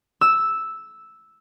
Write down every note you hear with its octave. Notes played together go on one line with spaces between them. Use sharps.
E6